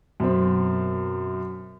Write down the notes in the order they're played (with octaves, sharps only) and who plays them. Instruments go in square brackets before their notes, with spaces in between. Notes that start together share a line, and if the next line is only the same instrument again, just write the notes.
[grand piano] F#2 B2 C4